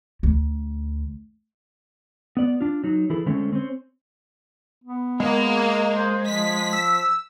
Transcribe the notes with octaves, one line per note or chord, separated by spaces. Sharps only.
D2
B3 D5
D4 F4
F#3 D#4
E3 E4 G#4 A4
D3 G#3 A3 C4 C#4
C4 C#4 C5
B3
G#3 A#3
C5
F3 B6
E6